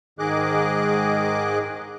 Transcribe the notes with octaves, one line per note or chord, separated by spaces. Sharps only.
G#2 D#3 G#4 D#5 D6 F#6